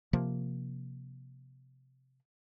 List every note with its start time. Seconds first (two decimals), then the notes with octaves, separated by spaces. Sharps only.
0.13 C3 F3 A#3